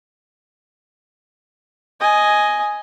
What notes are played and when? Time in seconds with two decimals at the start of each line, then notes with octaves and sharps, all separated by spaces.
2.00 D#5 G#5